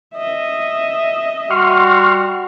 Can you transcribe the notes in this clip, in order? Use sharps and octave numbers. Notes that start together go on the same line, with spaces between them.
D#5 E5
G3 F#4 C6 C#6 F6